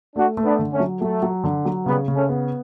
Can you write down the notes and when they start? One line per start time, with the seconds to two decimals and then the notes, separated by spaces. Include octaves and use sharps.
0.16 A3 D4 F#4
0.37 A3
0.44 B3 D4
0.59 D3
0.73 A3 C#4
0.80 F#3
1.01 F#3 A3
1.23 F#3
1.44 D3
1.65 F#3
1.86 C#3 G3 B3
2.08 C#3
2.15 A3 C#4
2.29 B3